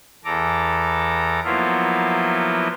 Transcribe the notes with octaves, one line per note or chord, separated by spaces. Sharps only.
E2 A4 A#5 D6
F3 F#3 A#3 B3 E4 F4